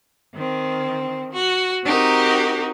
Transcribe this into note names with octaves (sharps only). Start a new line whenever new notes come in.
D#3 C4
F#4
C4 D#4 F#4 G4 A#4